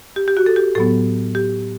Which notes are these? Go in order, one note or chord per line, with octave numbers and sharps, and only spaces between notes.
G4
G4
F#4
A4
G4
A2 F#3 B3 A4
G4